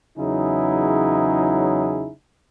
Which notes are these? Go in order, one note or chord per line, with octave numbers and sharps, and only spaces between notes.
E2 C#3 F#3 D#4 E4 G#4